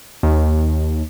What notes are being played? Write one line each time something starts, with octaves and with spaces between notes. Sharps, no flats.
D#2